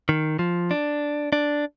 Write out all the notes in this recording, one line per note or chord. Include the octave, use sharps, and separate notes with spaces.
D#3
F3
D4
D4